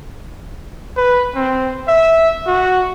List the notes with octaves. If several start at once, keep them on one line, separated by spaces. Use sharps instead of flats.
B4
C4
E5
F#4